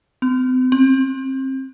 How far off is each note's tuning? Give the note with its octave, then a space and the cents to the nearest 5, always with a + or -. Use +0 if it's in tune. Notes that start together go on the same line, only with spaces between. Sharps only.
C4 -40
C4 +30